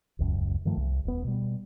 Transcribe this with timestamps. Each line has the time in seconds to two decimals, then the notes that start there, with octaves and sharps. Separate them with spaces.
0.19 D#1 C#2 F#2
0.65 G2 D#3 F3 A3
0.77 C2
1.05 D#1 B3
1.25 B2 G3